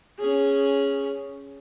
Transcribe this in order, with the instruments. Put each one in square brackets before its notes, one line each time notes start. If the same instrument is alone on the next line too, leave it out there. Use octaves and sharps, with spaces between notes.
[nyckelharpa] C#4 G#4